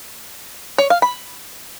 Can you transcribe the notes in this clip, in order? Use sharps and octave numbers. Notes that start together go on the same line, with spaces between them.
C#5
F5
B5